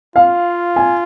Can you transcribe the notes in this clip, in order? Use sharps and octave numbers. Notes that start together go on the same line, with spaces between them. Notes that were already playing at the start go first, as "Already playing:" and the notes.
F4 F5
G#5